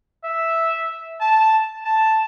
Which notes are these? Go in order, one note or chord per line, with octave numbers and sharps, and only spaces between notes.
E5
A5
A5